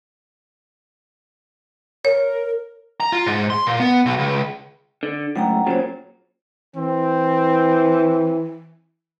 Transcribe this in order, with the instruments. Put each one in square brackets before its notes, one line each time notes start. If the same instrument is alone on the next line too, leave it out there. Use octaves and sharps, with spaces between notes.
[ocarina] A#4 [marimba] C#5
[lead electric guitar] A#5
F4
G#2
C6
A#2
B3
B1
C#2
[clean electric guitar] D3
[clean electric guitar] C#2 F#2 A2 [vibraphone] F#5 G5 A#5
[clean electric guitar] A#2 C#3 F#3 [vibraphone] C5 C#5
[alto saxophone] E3 [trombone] C4